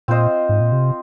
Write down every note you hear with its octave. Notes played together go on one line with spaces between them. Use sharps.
A#2 C4 F4 C5 D#5
G#2
A#2
C3